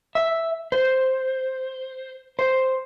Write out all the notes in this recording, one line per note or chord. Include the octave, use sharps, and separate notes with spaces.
E5
C5
C5